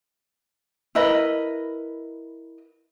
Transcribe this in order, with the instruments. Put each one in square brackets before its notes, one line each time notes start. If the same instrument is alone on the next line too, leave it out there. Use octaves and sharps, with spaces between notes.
[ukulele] E4 A#4 B4 D#5